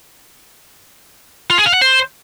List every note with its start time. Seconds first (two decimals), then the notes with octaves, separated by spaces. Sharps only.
1.50 F4
1.58 G#4
1.66 F5
1.74 F#5
1.81 C5